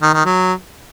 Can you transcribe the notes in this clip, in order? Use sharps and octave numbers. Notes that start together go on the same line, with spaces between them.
D#3
D#3
F#3